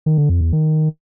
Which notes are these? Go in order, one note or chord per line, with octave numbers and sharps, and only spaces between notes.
D#3
D3
F2
E2
D#3